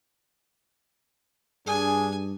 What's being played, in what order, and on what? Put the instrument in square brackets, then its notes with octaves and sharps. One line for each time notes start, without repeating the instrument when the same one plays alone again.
[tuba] G2 [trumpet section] D4 G#4 [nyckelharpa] G#5